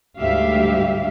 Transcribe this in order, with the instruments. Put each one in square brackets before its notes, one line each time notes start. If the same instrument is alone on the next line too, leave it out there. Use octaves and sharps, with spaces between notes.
[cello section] D2 G#2 G3 G4 E5 F5